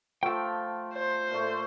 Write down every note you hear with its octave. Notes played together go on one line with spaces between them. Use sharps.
F3 A3 F4 G5 E6
C5
A#2 A3